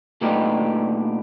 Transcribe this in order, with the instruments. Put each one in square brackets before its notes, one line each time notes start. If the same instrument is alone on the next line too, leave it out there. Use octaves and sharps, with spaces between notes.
[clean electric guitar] A#2 A3 B3 D4 D#4 G4